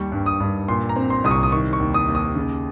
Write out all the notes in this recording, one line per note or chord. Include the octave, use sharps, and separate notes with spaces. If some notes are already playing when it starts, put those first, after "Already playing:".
Already playing: D#2 G3 C#6
G2
D#6
G2
A#2 C6
A#5
C4
C6
C2 D#6
C#6
D#6
D#3 C#6
C#6
D#2
D#6
D#2
D#6
C#3